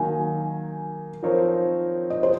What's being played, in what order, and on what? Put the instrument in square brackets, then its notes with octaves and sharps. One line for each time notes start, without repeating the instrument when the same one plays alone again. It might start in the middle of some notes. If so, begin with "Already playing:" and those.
Already playing: [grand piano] D#3 F#3 A#3 D#4 [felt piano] G#5
[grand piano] F3 C4 D#4 A#4 C#5
[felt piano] D#5
C5